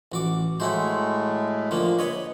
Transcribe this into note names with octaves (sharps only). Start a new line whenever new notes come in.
A1 F#4 D6
A2 G#3 A3 E4 F#4 C5
D3 F3 A#3
B4 C#5 D#5